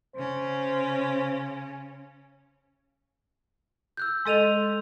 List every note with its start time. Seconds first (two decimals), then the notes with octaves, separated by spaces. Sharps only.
0.15 C#3 C#4 C5
3.97 E6 F#6 G6
4.25 G#3 A4 D#5 C6 D#7 F7